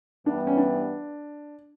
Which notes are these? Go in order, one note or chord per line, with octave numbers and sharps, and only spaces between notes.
G2 E3 G3 B3 D4
C#4
D4